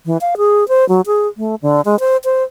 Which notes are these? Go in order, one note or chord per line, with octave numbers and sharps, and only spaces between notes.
E3
F5
G#4
C5
F#3
G#4
A3
D3
G#3
C5
C5